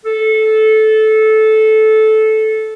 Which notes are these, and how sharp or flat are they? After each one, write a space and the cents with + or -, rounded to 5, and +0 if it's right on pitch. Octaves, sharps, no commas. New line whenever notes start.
A4 -15